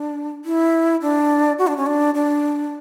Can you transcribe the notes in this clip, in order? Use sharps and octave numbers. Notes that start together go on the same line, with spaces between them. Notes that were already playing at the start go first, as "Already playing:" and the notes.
Already playing: D4
E4
D4
F#4
D4
C#4
D4
D4